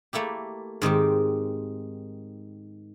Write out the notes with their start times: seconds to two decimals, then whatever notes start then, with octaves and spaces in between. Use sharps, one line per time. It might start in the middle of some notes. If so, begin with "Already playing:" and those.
0.13 A3 A#3 E4 G4
0.82 G#2 D#3 C4 G4